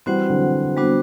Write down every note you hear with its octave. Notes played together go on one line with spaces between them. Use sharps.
E3 G3 C4 F#4 C5 F#5
D3 F#3
G3 B3 D4 F#4 C5